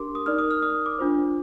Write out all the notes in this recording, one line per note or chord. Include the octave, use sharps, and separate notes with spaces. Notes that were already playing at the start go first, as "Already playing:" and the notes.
Already playing: D4 G4 A#4 C6 D6
D#6
D#4 A#4 D5 F6
D#6
F6
D#6
D6
D4 F4 C5